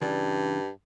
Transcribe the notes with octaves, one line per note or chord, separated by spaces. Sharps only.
G2 C#3 E3 D4